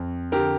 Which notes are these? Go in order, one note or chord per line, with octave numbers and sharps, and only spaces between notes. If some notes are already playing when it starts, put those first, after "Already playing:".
Already playing: F2
D3 G4 A#4